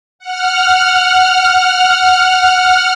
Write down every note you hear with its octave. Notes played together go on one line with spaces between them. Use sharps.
F#5 F6